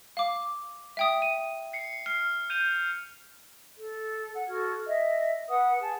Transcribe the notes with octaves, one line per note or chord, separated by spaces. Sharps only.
F5 D6
E5 G5 D#6
D#7
C7 C#7
F6 C7
G6 D#7 F7
A4
F#5
F#4 A4 F6 G#6
D#5 E5
B4 F#5 D#6
G#4 A5